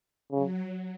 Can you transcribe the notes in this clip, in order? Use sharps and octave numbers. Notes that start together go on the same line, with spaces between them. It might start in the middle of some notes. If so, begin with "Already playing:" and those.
C#3 F#3